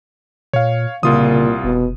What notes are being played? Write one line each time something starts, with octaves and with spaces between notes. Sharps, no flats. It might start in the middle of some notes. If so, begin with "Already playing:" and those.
A#2 C#5 F5
C2 A#2 C#3 F4 D#6
F1 B2